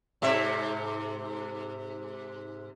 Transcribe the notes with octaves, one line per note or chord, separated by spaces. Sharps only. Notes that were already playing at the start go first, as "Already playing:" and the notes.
G#2 C3 E5